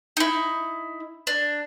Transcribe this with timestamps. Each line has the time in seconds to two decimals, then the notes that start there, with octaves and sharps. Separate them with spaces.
0.17 D#4 E4
1.27 D4